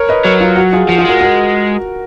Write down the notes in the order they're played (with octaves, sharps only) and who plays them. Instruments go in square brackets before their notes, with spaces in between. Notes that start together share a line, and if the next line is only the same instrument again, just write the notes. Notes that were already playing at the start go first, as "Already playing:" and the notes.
Already playing: [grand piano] A#4 C#5
B4 D#5
[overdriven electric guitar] F#3 [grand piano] A#4 C#5
[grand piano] F4
F#4
F4 G#4
[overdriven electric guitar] F3 [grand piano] F#4
[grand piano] F4 G#4
[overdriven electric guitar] G#3 [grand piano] F#4 A#4
[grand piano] F#4 A#4